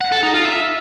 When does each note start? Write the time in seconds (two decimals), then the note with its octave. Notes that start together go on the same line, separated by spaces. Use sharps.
0.01 F#5
0.12 A4
0.23 D#4
0.34 F4
0.45 E5